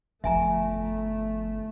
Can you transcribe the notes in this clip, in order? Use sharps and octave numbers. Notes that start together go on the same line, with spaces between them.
G1 F2 F3 A3 E5 G#5 A#5